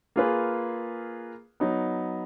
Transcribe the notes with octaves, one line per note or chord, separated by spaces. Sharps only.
A#3 F4 G#4 B4
F#3 B3 D#4